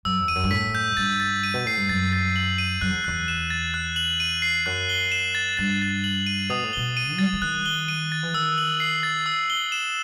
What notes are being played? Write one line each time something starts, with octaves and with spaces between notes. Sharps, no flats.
F#2 E6
E2
D#7
F#2
G2
A2 B6
G6
G2 A6
A6
D#7
B2
A2 C7
G2
F#2 A6
A6
F#7
D#7
F#2 F#6
E2
E2 F#6
E7
A6
F#6
F#7
D#7
C7
F#2 F#6
G7
E7
A6
G2 A6
A6
F#7
D#7
B2 D#6
A2
B2 G7
D#7
G3 A6
F#3
E3
D#3 F#6
G7
D#7
A6
E3
D#3 E6
F#7
C7
A6
E6
G7
E7